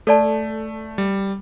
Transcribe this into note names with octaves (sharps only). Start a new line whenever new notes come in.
A3 A4 D5 A5
G3